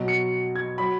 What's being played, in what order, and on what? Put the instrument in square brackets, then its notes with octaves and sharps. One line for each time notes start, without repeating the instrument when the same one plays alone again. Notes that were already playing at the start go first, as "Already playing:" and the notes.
Already playing: [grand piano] B2 F#3
C#7
G#6
F#3 B5